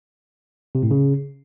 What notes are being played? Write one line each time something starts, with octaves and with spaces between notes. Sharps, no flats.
C3
A2
C#3